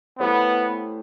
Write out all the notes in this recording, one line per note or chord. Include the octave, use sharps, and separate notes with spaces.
A3 B3 C#4 E4 G4 C5